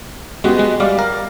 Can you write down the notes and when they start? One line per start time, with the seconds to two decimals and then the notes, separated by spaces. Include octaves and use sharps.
0.44 G#3 B3 F#4 G4
0.59 G#3
0.80 G3 D5 F5
0.99 A#4